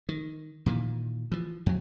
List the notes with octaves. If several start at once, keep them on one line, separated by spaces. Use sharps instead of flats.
D#3
A#2 D#3 E3
E3 F3
F2 F#3